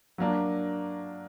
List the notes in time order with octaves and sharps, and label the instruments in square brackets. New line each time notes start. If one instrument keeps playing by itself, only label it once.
[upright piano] F#3 A#3 D4